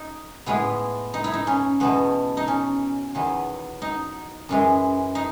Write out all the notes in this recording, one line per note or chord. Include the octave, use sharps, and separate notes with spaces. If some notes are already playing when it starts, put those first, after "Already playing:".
Already playing: D#4
A2 G#3 B3 E4
D#4
E4
D#4
C#4
E2 B2 A3 B3
D#4
C#4
E2 D#3 F#3 B3
D#4
F#2 E3 G#3
D#4